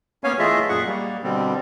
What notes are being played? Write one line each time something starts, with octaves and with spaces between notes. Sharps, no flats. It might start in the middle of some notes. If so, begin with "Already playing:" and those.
A#3 B3 C#4 C#5 F5 G#5
E3 A3 F4 G#4 D#5 E5
F#2 A#2 G#4 F#5 C#6
G3 A#3
B2 D3 G3 C4